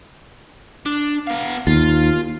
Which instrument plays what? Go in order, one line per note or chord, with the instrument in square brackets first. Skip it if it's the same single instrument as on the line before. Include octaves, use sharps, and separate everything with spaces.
[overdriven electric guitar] D4
B3 F5
[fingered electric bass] D#2 [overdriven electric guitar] F4